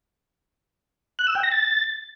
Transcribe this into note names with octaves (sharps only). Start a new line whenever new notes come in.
F#6
E6
G5
A#6
A6